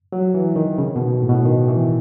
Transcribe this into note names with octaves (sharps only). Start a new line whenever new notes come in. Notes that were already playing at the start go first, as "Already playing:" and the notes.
F#3
E3
D#3
C#3
B2
A2
B2
D#3
E3